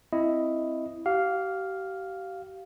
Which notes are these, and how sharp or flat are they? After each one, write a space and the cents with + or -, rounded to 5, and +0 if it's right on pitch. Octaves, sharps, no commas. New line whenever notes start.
C4 +0 E4 +0 D#5 +0
G4 -35 F5 +0